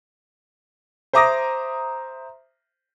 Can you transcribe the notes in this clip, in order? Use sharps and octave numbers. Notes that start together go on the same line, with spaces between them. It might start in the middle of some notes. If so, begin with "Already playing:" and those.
C5 E5 A#5 D6 D#6 A#6